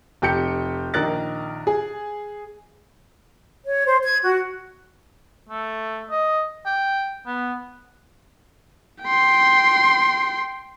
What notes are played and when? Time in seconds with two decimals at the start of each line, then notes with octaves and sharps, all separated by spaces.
0.22 F1 G4 G5 G6 C#7
0.94 A#1 D#3 A#4 F#6 A6
1.67 G#4
3.66 C#5
3.86 C5
4.03 G#6
4.24 F#4
5.49 A3
6.11 D#5
6.66 G5
7.27 B3
9.04 G5 C6